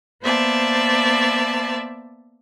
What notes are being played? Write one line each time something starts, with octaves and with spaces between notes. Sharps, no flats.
A#3 B3 C5 D5 E5 A5